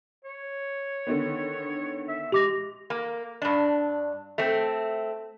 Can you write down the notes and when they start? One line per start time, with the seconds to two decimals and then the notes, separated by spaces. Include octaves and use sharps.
0.25 C#5
1.07 D3 D#3 B3
2.08 E5
2.32 G#3 G4 D6 A#6 F7
2.90 A#3
3.42 G2 D4
4.38 A3 C4